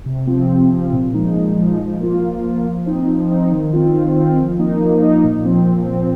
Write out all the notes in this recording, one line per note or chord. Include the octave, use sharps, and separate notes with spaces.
C3
F3 C4
C3
F3 C4
A#2
F3 G#3 D#4
A#2
F3 G#3 D#4
F3
A#3 F4
F3
A#3 F4
F3
C4 D#4
F3
C4 D#4
D#3
C4 F4
D#3
C4 F4
F3
A#3 D#4
F3
A#3 D#4
A#2
F3 C4
A#2
F3 C4